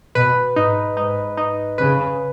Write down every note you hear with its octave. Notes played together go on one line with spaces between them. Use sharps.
B2 B4
G#2 D#4
G#2 D#4
D#4
C#3 B4